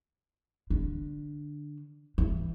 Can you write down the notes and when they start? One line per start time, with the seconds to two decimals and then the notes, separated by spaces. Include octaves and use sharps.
0.70 D3
2.18 E3